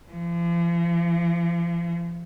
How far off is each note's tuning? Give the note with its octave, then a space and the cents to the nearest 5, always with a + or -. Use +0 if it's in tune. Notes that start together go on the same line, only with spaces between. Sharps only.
F3 -40